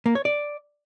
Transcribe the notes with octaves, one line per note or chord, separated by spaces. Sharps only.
A#3
C#5
D5